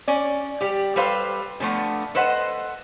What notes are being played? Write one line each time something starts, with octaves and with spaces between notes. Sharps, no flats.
C#4 D5
G3 G4
G3 A4 B4 C5 F5
D3 F3 A3 B3
A4 B4 C5 D#5 F#5